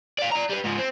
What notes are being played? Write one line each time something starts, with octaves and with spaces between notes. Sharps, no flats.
D5 F5
D5 A#5
G3 B4
G#2 F3
C4